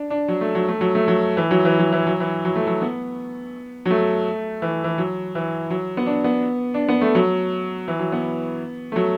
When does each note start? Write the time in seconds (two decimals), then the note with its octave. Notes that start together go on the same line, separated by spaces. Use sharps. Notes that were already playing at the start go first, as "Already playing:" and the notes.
Already playing: D4
0.10 D4
0.28 F#3
0.41 A3
0.55 F#3
0.69 A3
0.81 F#3
0.95 A3
1.08 F#3
1.37 E3
1.51 F#3
1.65 E3
1.79 F#3
1.92 E3
2.07 F#3
2.20 E3
2.45 F#3
2.56 A3
2.67 F#3
2.82 B3
3.86 F#3
3.91 A3
4.62 E3
4.84 E3
4.98 F#3
5.35 E3
5.70 F#3
5.97 B3
6.06 D4
6.24 B3
6.74 D4
6.89 B3
7.01 A3
7.15 F#3
7.88 E3
7.99 F#3
8.12 B3
8.92 A3
8.96 F#3